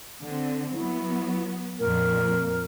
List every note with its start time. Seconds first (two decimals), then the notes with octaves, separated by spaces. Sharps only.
0.23 D3 C4
0.74 F#3 B3 E4
1.80 F2 A#2 A#4